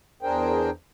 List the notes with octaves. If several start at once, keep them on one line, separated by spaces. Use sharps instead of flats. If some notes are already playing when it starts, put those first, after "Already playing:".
E2 D4 G#4 A#4 C5 G5